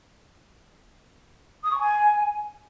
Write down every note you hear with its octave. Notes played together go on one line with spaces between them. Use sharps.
D#6
C#6
G#5